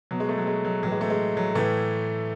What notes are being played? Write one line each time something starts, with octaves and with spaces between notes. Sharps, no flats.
B2 F#3
G#3
A3
F#3
G#3
F#3
A2 E3 F#3
G#3
A3
G#3
F#3
A2 E3 A3